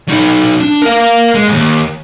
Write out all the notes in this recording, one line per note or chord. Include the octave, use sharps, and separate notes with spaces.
F#3 D#4
D4
A#4 F5
G#3
D#2 G#2